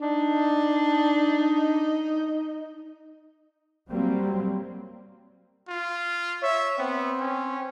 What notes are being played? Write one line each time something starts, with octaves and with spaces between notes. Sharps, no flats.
D4 D#4
F#3 G3 A#3 C4
F4
C#5 E5
B3 C4
C#4